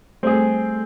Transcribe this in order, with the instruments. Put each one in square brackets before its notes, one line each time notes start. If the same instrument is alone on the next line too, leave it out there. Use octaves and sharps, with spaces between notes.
[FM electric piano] G3 A3 [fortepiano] C4 G#4